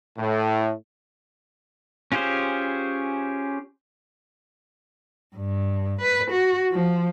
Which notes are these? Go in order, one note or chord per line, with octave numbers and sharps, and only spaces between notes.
A2
C#4 F4 G4 G#4 C5
G2
B4
F#4
F3